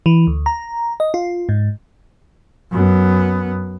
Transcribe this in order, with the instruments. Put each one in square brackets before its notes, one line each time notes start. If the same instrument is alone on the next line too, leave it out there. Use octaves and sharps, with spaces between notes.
[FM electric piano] E3
D2
A#5
D#5
F4
G#2
[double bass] F#2 B3